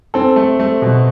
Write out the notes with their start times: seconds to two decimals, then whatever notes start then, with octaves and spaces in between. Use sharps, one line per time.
0.14 C4 A4
0.36 A3
0.60 A3
0.82 B2